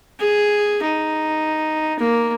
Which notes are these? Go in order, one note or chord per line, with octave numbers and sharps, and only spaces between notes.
G#4
D#4
A#3